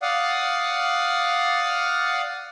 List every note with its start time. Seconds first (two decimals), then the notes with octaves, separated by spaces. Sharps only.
0.02 D5 F5 F#5 D#6